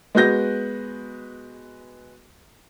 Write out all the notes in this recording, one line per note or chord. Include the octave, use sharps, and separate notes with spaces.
G#3 B3 F#4 B4 G6 A#6